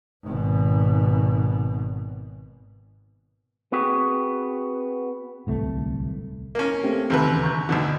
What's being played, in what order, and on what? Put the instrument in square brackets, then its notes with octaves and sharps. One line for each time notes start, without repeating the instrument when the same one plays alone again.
[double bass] G#1 B2
[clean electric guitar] B3 C4 F#4 G#4 B4
[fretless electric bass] D1 C2 A3
[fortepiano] A#3 C#4
[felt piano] A3 C4 G4
[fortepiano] D#2 C3 B4
[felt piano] E1 C#3
A#5 C#6 G6
[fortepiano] D2 B2 D3